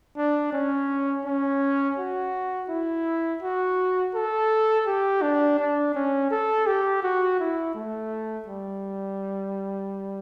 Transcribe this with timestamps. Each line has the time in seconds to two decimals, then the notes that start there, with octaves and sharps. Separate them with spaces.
0.17 D4
0.52 C#4
1.25 C#4
1.98 F#4
2.69 E4
3.42 F#4
4.15 A4
4.86 G4
5.22 D4
5.59 D4
5.95 C#4
6.31 A4
6.67 G4
7.03 F#4
7.40 E4
7.75 A3
8.48 G3